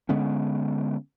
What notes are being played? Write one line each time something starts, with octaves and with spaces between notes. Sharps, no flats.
D3 G#3 B3 C#4